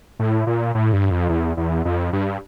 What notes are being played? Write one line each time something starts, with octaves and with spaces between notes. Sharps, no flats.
A2
A#2
A2
G2
F2
E2
E2
F2
G2